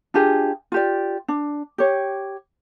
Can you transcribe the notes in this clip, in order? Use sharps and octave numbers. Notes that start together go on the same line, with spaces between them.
D4 F4 G4 G#4
F4 G4 D5
D4
G4 C#5